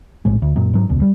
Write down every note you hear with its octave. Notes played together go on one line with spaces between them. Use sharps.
A#1 A2 G#3
D2
F#2 A#2
G#2 F#3
E1 C#2 B2
G3